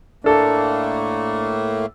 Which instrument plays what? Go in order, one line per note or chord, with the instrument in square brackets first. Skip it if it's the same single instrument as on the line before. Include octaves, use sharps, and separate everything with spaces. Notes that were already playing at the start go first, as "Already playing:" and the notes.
[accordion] A2 A3 A#3 [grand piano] D4 A4